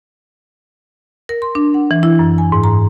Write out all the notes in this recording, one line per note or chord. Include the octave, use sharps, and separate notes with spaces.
A#4
C6
D4
F#5
E3
E4
F#2
G#5
G#2
A#5